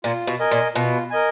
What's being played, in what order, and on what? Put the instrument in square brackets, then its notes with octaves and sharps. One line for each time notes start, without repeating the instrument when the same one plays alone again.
[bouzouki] A#2 [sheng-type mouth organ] F4
[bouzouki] B2
[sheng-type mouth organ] A#4 D#5 G#5
[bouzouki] A#2
[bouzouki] B2 [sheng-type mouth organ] F4
[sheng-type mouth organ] A#4 D#5 G#5